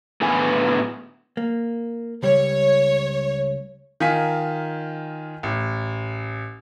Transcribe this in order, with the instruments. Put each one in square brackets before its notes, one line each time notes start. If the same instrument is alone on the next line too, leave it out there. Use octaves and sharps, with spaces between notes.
[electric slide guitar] A2 D3 B3 G#4 B4 G#5
[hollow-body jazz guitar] A#3
[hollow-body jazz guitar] C#2 G3 [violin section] C#5
[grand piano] D#3 F4 G#5 B6
A1